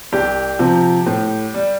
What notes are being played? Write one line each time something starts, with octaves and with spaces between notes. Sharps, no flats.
C2 G4
C3 F3
A2
G3